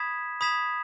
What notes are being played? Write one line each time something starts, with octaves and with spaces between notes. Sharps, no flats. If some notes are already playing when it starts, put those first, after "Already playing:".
Already playing: B5 D#6 G#6 B6 E7
B5 D#6 G#6 B6 E7